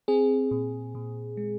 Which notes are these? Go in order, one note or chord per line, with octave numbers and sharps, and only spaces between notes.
C4 G#4
A#2
A#2
G#3